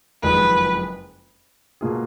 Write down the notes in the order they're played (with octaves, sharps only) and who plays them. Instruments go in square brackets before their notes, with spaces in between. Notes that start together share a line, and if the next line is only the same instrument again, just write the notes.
[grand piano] F#1 F2 D#3 G#3 [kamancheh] B4
[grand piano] B2 A#3 F4 G#4